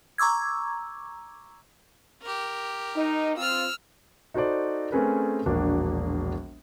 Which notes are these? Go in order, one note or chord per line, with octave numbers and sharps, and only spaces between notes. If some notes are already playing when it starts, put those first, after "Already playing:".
A#5 C#6 D6 E6 G#6
G4 A#4
D#4
C4 F4 E6 F6
D#4 F#4 A4 C5 D5
A3 C4 C#4 G#4 A#4 B4
E1 A#1 A#3 D4 F#4